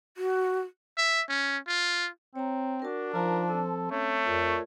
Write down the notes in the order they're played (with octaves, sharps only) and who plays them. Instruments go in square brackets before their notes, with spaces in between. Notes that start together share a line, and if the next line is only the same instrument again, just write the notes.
[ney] F#4
[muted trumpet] E5
C#4
F4
[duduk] C4 [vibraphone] C#5 A#5
[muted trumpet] D4 [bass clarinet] F#4 [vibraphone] A#4 A5
[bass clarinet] F3 [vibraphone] D#4 F4 F5 [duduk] A#4
[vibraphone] C4 [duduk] A4
[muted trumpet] A3 [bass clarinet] C#4 [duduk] C#5
[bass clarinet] F2 [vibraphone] F4 A#4 D5